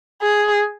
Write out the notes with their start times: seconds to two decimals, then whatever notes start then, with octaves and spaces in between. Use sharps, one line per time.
0.22 G#4